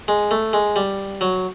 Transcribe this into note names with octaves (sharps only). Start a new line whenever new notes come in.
G#3
A3
G#3
G3
F#3